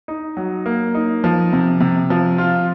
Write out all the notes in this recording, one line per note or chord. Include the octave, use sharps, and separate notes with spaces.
D#4
F#3
A#3
D#4
F3
C3
C3
F3
F4